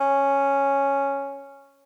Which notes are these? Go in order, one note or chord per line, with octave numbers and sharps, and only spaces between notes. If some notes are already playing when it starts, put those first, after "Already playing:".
C#4